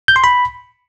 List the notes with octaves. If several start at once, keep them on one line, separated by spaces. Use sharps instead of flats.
G6
C6
B5